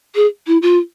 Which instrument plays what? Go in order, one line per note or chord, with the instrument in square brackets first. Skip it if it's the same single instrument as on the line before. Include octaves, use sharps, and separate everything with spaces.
[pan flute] G#4
E4
F4